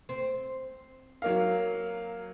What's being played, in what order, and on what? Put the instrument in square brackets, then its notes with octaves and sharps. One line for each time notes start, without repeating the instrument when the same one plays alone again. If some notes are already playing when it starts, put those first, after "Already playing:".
[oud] C4
[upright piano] F#3 A#3 F5